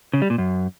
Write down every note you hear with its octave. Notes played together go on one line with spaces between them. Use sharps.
C#3
G3
A#2
F#2